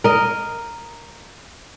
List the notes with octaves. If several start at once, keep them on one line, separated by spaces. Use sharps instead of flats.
A#4 D#5